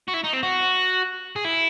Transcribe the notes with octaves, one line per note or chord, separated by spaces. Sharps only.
F#4
E4
D#4
C4
F#4
G#4
E4